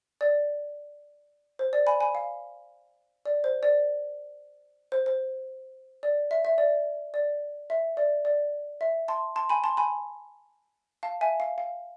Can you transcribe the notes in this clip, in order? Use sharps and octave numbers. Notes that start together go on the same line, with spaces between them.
D5
C5
D5
G#5 B5
G#5 B5
F5
D5
C5
D5
C5
C5
D5
E5
E5
D5
D5
E5
D5
D5
E5
A5 C6
A5 C6
G#5 B5
A5 C6
G#5 B5
F5 A5
E5 G#5
F5
F5